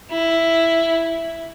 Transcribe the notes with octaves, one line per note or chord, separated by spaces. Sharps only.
E4